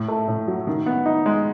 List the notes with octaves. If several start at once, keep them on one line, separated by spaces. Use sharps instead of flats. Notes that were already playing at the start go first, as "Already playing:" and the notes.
Already playing: A2
A3
A2
F#3
D#3
B3
D#4
G#3